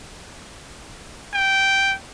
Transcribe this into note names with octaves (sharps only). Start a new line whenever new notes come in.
G5